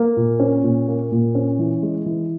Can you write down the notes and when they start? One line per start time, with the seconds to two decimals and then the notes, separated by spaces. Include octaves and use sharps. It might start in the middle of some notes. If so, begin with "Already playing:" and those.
Already playing: A#3
0.17 A#2
0.40 C#4
0.63 A#2
0.88 A#3
1.12 A#2
1.35 C#4
1.59 E3
1.83 G#3
2.06 E3